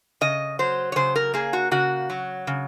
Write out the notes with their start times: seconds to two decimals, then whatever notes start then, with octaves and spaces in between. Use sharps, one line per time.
0.21 C#3 D#5
0.59 F#3 C5
0.92 C#5
0.96 C#3 C5
1.16 A#4
1.34 A#3 G#4
1.53 F#4
1.71 C#3 F#4
2.10 F#3
2.47 C#3